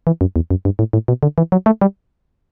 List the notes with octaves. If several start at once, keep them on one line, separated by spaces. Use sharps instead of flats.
E3
F#2
E2
F#2
G2
A2
A2
B2
D3
E3
F#3
A3
G3